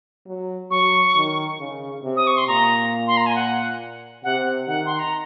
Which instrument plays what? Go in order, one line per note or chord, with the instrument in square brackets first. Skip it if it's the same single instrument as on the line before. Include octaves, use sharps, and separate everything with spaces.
[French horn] F#3
[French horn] F#3 [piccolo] C#6
[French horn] D#3
C#3
C3
[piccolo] D#6
C#6
C6
[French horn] A#2 [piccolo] A#5
[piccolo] C6
A#5
G#5
F#5
[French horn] C3 [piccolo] F#5
[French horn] D#3 [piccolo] F#5
[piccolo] C6
A#5